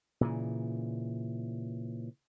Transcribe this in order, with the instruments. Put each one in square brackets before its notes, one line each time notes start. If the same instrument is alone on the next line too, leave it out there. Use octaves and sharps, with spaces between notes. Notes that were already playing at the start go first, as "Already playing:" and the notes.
[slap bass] A#2 C#3 E3